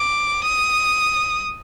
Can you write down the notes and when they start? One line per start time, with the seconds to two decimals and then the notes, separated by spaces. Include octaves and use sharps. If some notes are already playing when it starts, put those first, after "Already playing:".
Already playing: D6
0.44 D#6